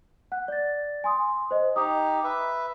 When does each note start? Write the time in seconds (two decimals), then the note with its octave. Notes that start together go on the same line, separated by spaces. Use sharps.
0.32 F#5 F#6
0.48 D5 A6
1.04 G#5 C6 D#6
1.51 C5 D#5
1.76 D#4 G4 D#6
2.24 B4 E5